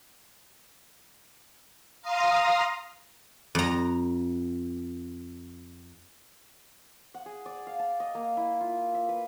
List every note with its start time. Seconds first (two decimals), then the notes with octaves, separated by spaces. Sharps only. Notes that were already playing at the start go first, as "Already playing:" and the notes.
2.02 F5 A#5 C6 D#6
3.55 F2 A#5
7.14 F#5
7.26 G#4
7.46 D5
7.67 F5
7.79 A5
8.00 D#5
8.15 A#3
8.37 E4
8.61 F4
8.95 E5
9.09 B4